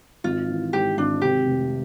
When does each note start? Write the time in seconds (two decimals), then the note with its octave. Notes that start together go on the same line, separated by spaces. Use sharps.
0.24 G#1 F4
0.49 E3
0.73 G#2 G4
0.98 G#1 D4
1.21 C3 G4
1.46 F1